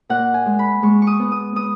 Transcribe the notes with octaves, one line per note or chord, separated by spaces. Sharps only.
A#2 F#5
G#5
G#3
B5
G#3 C#6
C#6
D#6
B3
D#6
B3 D#6